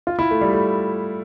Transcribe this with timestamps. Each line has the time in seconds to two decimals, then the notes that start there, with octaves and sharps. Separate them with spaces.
0.07 F4
0.19 E4
0.31 A3
0.41 G3
0.53 A3